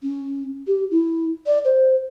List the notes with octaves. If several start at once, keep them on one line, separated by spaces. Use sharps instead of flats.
C#4
G4
E4
D5
C5